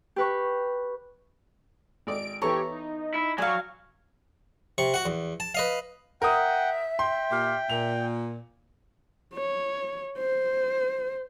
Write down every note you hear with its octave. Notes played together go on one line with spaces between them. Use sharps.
G4 B4 C#6
G#1 D5 D7
E3 B3 G4 A4 C#5 A#5 C#6
D#4
E4
F#3 D5 F5 G#5 C#6
C3 C#6
F#4 F#5
E2
A5
B4 D#5 F5
A#4 E5 F#5 G5 D#6
G5 C6
A#2 G4 F5
A#2 F7
C#5
C5